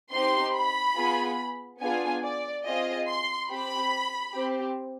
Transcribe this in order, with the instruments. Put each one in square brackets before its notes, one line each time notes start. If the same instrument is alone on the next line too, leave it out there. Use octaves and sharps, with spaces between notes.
[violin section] C4 D#4 G4 C6
B5
B3 F4 G#4
B3 D4 F4 G#4 G#5
D5
C4 F4 G#4 D#5
C6
C4 G4 B5
C4 G4